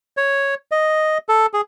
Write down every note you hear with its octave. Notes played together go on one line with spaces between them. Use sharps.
C#5
D#5
A4
G#4